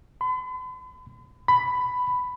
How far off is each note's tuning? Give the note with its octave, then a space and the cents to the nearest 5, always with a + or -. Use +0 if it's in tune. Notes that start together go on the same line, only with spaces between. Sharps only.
B5 +45
B5 +10